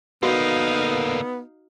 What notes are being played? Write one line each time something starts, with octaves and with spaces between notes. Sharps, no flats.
D3 A#3 B3 D#4 F#4 F5